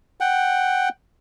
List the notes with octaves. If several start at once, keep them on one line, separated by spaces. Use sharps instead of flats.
F#5 G5